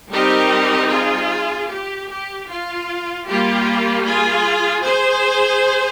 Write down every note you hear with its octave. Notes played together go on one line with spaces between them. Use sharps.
G3 C4 D#4 G4 A#4
F4 G#4
G4
G4
F4
G3 A#3 F4 G4
F4 G#4
G#4 C5